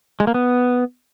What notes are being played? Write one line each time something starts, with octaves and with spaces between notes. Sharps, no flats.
G#3
A#3
B3